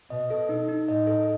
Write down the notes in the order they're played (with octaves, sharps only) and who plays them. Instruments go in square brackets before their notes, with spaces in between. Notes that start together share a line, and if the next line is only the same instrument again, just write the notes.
[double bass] B2 [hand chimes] D#5
[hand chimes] A4
D#4
D#4
[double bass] A2 [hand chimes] D#5
[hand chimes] A4